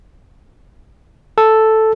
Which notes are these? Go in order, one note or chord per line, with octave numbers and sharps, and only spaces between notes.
A4